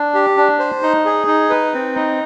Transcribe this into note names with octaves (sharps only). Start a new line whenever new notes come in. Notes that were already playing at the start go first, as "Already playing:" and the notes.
Already playing: D4
G4
D4
C5
D#4
G#4
D#4
B4
C4
D#4